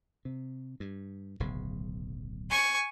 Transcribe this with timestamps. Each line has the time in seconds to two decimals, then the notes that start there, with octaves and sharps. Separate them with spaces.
0.25 C3
0.80 G2
1.40 D1 B1 C#3
2.50 G#5 C#6